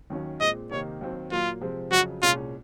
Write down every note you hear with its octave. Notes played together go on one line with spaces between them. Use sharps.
D#2 D#3 F#3 C#4
A#2 G#3 C4 D#5
C3 D#3 A#3 D#4 C#5
D#2 D#3 F#3 C4
A#2 F#3 A#3 F4
C3 F3 G#3 C4
F2 C#3 F#3 F#4
C2 A#2 G#3 C#4 F4